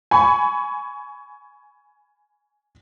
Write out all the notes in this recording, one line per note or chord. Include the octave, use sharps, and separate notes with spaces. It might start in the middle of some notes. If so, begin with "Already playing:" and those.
G#5 B5 C#6